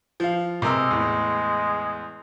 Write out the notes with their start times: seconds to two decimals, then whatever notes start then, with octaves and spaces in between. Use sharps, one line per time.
0.20 F3 F5
0.62 C3 G#3 A#4 E6
0.91 E2 A2